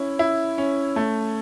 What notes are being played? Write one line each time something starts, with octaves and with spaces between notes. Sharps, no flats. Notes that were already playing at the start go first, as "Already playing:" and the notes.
Already playing: C#4 E4
E4
C#4
A3